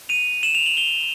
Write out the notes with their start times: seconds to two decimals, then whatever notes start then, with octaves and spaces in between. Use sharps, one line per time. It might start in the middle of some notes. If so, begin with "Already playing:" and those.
0.09 D#7 F7
0.43 E7 F#7
0.55 F7
0.66 F#7
0.77 F7 G7